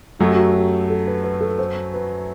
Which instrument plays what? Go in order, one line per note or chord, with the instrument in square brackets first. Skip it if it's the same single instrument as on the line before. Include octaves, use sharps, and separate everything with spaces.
[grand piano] F#2 F#3 A3 [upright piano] F#4
[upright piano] G4
F#4
G4
A4
B4
B4
A4
C5
B4